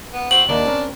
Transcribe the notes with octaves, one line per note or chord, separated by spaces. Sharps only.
B3
C4 F#4 F#7
D#2 D#3 A#3 D4
C4 C#4 A#4